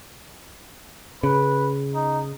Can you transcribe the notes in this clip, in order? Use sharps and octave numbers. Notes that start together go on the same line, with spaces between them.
C#3 B4
D#4